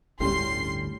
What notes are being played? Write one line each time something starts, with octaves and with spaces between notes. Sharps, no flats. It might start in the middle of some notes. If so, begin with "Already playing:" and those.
G1 D2 A2 G3 C#4 G4 C6 C7